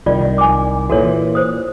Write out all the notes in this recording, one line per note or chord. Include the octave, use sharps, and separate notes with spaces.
C2 D#3 F4 D5
G#5 D6
A#2 E3 F#4 A4 C#5
C5 D#6